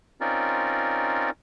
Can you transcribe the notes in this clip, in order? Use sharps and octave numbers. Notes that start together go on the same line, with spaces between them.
C4 C#4 D#4 F4 A#4 D5